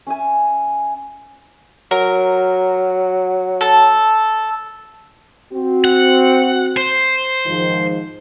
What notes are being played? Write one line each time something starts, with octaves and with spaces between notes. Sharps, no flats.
C#4 E5 G#5
F#3 A#4
A4
C4 F#4
F#5
C5
G#2 D#3 F3